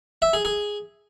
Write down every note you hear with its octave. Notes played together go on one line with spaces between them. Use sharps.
E5
G#4
G#4